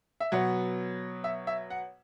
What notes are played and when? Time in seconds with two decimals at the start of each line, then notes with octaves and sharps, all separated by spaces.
0.20 E5
0.32 B2 F#3 B3 F#5
1.24 E5
1.47 E5
1.70 F#5